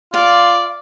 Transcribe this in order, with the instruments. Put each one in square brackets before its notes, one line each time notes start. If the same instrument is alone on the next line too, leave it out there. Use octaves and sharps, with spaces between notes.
[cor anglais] F4 [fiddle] D5 [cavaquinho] F5